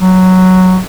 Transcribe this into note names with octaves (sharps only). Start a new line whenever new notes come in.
F#3